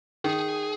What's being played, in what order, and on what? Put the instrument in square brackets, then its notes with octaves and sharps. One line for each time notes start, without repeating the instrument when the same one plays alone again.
[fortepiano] D#3 [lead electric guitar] G#4